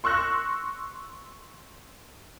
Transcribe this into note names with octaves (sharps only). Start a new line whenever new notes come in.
C6 C#6 E6 F#6 A#6